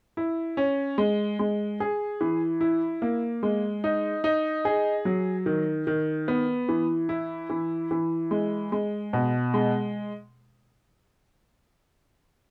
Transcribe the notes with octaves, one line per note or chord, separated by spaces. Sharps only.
E4
C#4
G#3
G#3
G#4
E3
E4
A#3
G#3
D#4
D#4
G#4
F#3
D#3
D#3
B3
E3
E4
E3
E3
G#3
G#3
B2
G#3